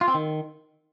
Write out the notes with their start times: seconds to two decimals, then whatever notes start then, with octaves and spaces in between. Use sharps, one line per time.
0.01 F4
0.08 C4
0.14 D#3